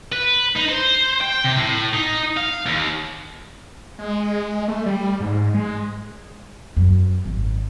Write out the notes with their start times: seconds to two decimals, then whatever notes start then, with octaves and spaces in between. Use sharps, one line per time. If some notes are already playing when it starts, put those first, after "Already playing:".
0.13 B4
0.57 D#4
0.70 C5
1.21 G5
1.44 C3
1.58 A2
1.94 D#4
2.37 F5
2.66 D#2
3.98 G#3
4.68 A3
4.86 G3
5.20 G#2
5.54 G#3
6.77 F#2
7.25 G#1